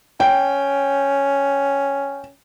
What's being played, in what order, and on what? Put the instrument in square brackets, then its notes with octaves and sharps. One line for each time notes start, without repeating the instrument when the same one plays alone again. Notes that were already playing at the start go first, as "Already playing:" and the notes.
[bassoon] C#4 [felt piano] G5